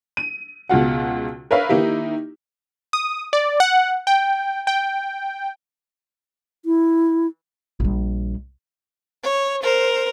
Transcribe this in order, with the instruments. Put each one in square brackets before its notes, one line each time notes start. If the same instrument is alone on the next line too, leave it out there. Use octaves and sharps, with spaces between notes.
[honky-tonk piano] D#7
C#2 B2 G#3 F4 F#4 F#5
A#4 B4 C#5 E5 F5
D#3 A#3 D#4 E4 G4
[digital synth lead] D#6
D5
F#5
G5
G5
[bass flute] E4
[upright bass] A#1 G3
[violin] C#5
A#4 C5